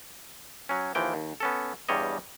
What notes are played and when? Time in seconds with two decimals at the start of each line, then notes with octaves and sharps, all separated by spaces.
0.69 F#3 C#4
0.95 D#2 E3 F3 G5
1.14 D#2
1.40 B3 C#4 A4
1.89 E2 G2 G3 C#5 D#5